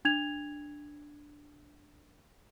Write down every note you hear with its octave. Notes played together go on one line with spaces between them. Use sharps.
D4 G#6 F7